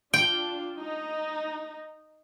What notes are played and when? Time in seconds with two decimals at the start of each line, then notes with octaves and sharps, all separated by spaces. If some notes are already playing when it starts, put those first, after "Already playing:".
0.14 D4 F4 G5
0.76 D#4